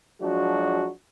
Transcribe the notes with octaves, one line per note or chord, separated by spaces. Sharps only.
F3 F#3 G#3 D4 F#4